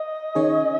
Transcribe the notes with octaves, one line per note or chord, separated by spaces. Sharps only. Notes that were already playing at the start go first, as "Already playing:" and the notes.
Already playing: D#5
D#3 C#4 G#4 C#5